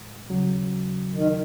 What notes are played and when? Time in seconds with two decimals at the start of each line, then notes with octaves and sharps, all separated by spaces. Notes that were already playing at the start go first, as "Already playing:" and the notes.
Already playing: A2 G#3
0.29 D#2 C#3 F#3
1.13 D#3